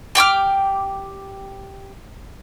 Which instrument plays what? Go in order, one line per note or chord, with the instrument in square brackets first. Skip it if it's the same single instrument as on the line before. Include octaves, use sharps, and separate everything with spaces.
[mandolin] G4 G5 D6 F6